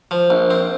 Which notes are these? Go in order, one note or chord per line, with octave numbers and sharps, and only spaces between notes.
F3
A#1
C4